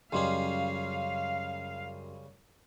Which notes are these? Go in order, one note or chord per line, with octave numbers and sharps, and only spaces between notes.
F#2 C#3 G3 C#4 D#5 F5 C6